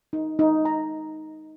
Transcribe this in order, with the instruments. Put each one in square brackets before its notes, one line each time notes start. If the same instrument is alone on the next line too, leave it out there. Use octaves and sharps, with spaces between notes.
[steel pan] D#4
D#4
A#5